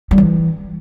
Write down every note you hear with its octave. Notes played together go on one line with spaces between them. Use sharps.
G3
E3